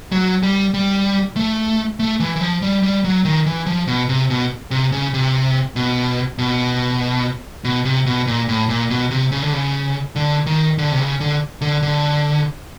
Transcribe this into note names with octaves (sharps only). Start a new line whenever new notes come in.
F#3
G3
G3
A3
A3
E3
E3
F3
G3
G3
F#3
D#3
E3
F3
B2
C3
B2
C3
C#3
C3
B2
B2
B2
C3
B2
A#2
A2
A#2
B2
C3
C#3
D3
C#3
D3
D#3
D3
C3
C#3
D3
D3
D3